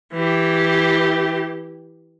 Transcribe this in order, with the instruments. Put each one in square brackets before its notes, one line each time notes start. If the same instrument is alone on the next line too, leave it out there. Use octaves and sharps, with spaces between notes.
[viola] E3 G4